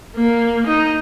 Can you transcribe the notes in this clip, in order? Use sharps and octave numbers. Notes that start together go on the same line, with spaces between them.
A#3
D#4